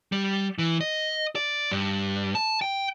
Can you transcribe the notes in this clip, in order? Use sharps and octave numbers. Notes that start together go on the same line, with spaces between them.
G3
E3
D#5
D5
G2
A5
G5